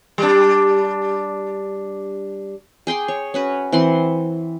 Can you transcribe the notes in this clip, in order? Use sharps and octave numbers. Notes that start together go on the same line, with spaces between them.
G3 D4
G#4 G5 C6 D6
C#5
C#4 F#4 B4
E3 C4 F#5 C6